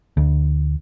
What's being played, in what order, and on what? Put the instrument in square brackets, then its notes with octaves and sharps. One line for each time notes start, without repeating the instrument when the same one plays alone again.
[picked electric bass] D2